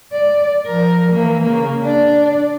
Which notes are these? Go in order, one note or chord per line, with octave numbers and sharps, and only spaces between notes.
D5
F3 A#4
E3 A#3
C#3 A#3
D4 D5